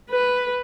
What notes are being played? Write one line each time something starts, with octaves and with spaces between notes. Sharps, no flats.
B4